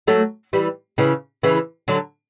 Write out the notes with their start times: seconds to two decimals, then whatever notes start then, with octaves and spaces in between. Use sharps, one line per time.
0.07 F#3 A3
0.53 E3 G3
0.98 C#3 E3
1.43 C#3 E3
1.88 D3 F#3